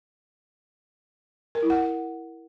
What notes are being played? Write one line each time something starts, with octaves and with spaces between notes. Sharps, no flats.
A#4
E4
F#5